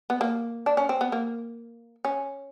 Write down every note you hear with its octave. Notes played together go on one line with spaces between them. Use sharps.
B3
A#3
D4
C#4
C4
B3
A#3
C#4